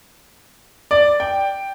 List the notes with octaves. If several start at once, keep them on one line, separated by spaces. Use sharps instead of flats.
D5
G5